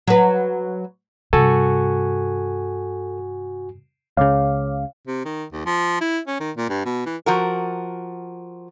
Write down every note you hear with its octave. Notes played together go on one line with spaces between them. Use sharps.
F#3 B4
G2 C3 F#4 A4 G#5
C#2 C#3 C#5 F5 D6
C3
D#3
D#2
F3
E4
C#4
D#3
A#2
G2
B2
E3
F3 F#4 A#4